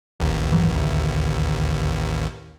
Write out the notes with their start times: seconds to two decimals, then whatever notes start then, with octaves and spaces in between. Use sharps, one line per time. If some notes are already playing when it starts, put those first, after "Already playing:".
0.20 D1 A1 D#2
0.52 G2 E3 F#3
0.76 D2